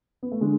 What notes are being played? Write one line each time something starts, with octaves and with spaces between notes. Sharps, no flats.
B3
A3
D3 G#3